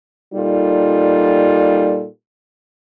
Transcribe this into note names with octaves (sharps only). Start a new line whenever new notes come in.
A#2 G3 D#4 F4 A4